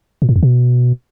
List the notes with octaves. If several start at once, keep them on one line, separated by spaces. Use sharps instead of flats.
A#2
A2
E2
B2